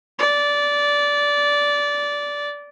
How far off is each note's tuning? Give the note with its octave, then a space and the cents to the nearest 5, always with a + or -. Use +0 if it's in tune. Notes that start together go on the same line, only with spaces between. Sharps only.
D5 -15